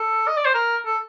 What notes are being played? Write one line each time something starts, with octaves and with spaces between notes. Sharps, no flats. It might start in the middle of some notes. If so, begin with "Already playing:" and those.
Already playing: A4
D#5
D5
C5
A#4
A4